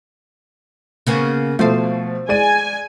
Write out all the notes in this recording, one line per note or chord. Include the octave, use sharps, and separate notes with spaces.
C#3 A#3 B3
B2 F3 A3 C5 F5
G#3 D5 G#5 D#7